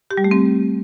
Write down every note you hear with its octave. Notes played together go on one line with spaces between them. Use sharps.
G4
G3
A3
C4